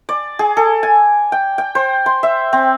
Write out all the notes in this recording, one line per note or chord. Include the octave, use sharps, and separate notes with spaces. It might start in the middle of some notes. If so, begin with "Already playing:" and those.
D5
G#4
A4
G#5
G5
G5
C5
C6
E5
C4